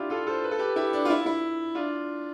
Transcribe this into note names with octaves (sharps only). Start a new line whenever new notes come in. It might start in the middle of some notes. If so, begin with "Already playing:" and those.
Already playing: D4 E4 F4 G4
F4 A4
A4 C5
B4
A4
G4 B4
E4 G4
D4
F4
E4
E4
D4 F4